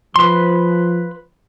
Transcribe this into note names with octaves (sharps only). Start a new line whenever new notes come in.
F3 B4 C6